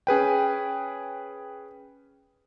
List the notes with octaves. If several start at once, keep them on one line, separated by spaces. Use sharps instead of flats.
C#4 G#4 B4 G5